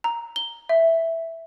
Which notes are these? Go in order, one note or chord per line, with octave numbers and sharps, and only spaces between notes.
A#5
G7
E5